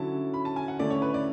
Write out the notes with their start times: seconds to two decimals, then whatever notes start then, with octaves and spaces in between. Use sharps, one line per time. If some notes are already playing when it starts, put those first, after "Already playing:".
Already playing: D3 F#3 C#4 E4 A5
0.34 B5
0.45 A5
0.56 G#5
0.68 F#5
0.79 D3 A3 C#4 E4 D5
0.91 C#5
1.02 B4
1.14 D5